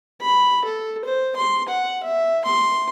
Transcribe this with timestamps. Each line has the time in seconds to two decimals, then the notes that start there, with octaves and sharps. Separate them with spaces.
0.21 B5
0.65 A4
1.05 C5
1.36 C6
1.68 F#5
2.03 E5
2.45 C6